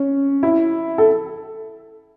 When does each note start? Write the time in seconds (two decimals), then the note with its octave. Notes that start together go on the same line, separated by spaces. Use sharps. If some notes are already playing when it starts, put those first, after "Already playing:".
Already playing: C#4
0.43 E4
0.98 A4